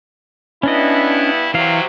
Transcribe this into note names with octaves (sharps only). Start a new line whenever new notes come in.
G2 B3 C#4 D4 E4 D#5
C3 E3 F#3 F5